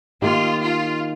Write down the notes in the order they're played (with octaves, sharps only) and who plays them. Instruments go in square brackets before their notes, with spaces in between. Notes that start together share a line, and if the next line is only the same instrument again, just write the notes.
[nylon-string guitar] D#3 A#3 D#4 G4 [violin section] F4
[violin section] F4